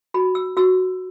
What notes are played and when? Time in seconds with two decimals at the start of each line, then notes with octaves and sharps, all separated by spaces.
0.14 F#4 B5
0.35 E6
0.57 F#4 E6